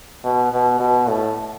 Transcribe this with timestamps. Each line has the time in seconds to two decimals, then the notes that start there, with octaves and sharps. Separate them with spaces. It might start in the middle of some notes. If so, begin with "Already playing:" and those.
0.24 B2
0.52 B2
0.80 B2
1.08 A2